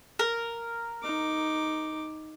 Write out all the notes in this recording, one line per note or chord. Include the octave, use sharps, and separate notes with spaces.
A#4
D#4 D6